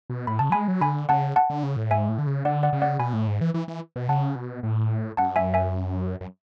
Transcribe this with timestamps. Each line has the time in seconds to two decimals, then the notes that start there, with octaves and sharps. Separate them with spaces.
0.10 B2
0.27 A2 B5
0.39 C#3 A5
0.50 F#3 G#3 G#5 B5
0.68 F#3
0.81 D3 G#5 B5
1.09 C#3 F#5 A5
1.36 F#5 A5
1.50 D3
1.63 C#3
1.76 A2
1.90 G#2 E5 G#5
2.09 A2
2.19 D3
2.27 C#3
2.45 D3 D5 F#5
2.63 D5 F#5
2.73 C#3
2.82 D5 F#5
2.99 B2 G#5 B5
3.13 A2
3.27 G#2
3.41 E3
3.54 E3
3.68 E3
3.96 B2
4.09 C#3 F#5 A5
4.35 B2
4.63 A2
5.17 F#2 F#5 A5
5.36 E5 G#5
5.54 E5 G#5
6.21 F#2